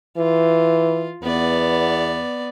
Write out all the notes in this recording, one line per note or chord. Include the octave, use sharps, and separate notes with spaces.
E3 F4
E2 B3 D5